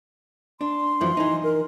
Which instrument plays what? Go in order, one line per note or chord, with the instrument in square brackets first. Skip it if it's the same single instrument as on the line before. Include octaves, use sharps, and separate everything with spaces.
[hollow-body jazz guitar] D4 [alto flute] C6
[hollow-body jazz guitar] F#2 E3 F3
E3 D#4
[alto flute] A#4